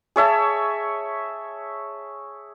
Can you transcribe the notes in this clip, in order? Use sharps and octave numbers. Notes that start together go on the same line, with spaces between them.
G#4 C#5 E5 A5